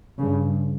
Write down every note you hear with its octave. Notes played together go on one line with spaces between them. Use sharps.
G2 C#3